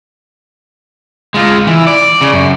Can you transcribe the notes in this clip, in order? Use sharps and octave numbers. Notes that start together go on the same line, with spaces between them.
G#3 F4
E3
D5
C#3
F#2